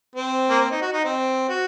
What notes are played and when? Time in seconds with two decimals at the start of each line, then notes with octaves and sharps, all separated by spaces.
0.16 C4
0.50 A#3
0.60 C4
0.72 D#4
0.82 F#4
0.93 D#4
1.05 C4
1.49 F#4